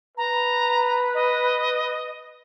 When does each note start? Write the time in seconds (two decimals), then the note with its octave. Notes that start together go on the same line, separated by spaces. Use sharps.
0.17 B4 A#5
1.14 D#5